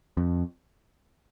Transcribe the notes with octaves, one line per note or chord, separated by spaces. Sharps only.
F2